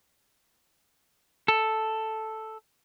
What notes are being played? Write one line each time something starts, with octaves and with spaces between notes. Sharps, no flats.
A4